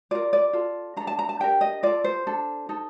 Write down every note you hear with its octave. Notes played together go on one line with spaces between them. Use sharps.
F4 A#4 D5
D5
F4 A4
D4 A4 A#5
A5
A#5
A5
D4 G4 A#4 G5
D#5
F4 A4 D5
C5
D4 A4
D#4 A4